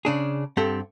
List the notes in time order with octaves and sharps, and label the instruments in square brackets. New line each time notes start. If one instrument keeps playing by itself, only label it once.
[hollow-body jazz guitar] C#3 D4 G#4
G2 C4 G4 A4 F#5